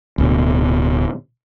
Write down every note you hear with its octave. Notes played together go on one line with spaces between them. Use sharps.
D1 D2 B2